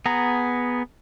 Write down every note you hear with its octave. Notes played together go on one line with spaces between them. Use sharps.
B3 G#4 A#5